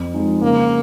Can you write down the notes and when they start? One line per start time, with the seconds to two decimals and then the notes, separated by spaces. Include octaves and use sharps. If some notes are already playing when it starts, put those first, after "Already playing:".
Already playing: F2
0.14 F3 G#3 D#4
0.42 C#3 A#3